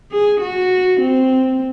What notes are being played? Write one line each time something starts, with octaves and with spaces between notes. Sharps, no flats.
G#4
F#4
C4